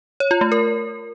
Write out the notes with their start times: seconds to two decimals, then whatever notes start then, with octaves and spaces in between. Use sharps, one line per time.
0.20 C#5
0.31 F4
0.41 A3
0.52 A#4